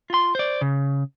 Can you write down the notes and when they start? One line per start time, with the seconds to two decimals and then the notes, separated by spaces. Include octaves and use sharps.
0.10 F4 C6
0.35 C5 D5
0.61 C#3